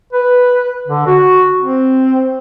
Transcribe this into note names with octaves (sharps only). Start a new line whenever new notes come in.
B4
D3
F#4
C4